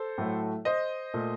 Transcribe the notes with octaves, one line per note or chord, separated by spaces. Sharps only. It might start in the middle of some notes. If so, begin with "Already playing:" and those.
Already playing: A4 C5
A2 F#3 A3
C5 D#5
A#2 A3